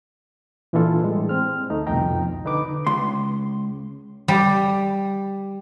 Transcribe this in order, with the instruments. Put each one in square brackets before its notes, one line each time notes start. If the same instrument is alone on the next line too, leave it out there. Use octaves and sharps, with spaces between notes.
[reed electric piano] A#2 E3 D4 E4 F4 A4
A2 G3 G#3
C4 F6
D2 A3 D#4
C2 F2 B2 D#4 G5 A#5
D3 D#4 B4 D6
[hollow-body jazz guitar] C#2 C6
[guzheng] G3